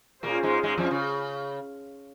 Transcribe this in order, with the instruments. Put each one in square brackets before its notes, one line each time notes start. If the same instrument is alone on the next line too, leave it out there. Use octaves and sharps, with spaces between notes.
[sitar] A#2 A#3 [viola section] C#4 F4 G#4 C5
[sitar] G#2 G#3
G#2 G#3
F2 F3
C#3